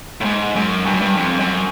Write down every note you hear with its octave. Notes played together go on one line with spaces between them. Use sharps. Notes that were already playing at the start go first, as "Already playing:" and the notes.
A2
G#2
F#2
G2
F#2
G2
F2
F#2